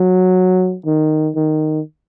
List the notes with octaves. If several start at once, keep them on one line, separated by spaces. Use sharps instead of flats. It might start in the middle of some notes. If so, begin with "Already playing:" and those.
Already playing: F#3
D#3
D#3